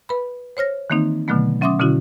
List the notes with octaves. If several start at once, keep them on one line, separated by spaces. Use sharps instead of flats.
B4 B5
C5 C#5 F6 A#6
D#3 E3 A#3 C4 D#4
B2 D3 D#3 F#3 A3 B3
F#3 C#4 E5 C6 D6 D#6
B2 D3 C#4 E4 F#4